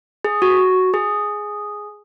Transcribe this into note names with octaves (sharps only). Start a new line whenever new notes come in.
G#4
F#4
G#4